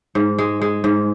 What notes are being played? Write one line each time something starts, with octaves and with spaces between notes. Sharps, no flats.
G#2
G#3
G#3
G#2